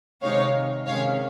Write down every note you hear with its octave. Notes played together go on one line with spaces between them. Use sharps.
C3 D#3 G#3 D#4 C#5 F5
C3 D#3 G#3 C#4 C#5 F5